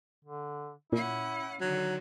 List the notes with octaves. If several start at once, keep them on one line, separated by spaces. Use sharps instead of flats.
D3
A#2 C#4 E4 F#5
D3 D#3 F#3